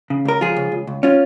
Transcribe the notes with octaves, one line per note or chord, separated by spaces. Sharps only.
C#3
C#2 A#4
F3 F4 G#4
C#2
C#2
C#2
C#4 F4